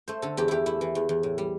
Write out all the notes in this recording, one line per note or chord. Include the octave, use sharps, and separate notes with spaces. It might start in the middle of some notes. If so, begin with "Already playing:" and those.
A3 C5
D3 A4
E2 G4
E2 E4 G4
A3 E4
E3
E2
E2
A2
G3